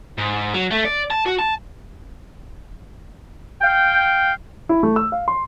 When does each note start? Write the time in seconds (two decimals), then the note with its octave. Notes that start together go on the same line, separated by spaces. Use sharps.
0.18 G#2
0.54 F#3
0.71 A3
0.85 D5
1.11 A5
1.26 F#4
1.39 A5
3.62 F5 G5
4.69 E4
4.83 A3
4.96 E6
5.12 F5
5.28 C6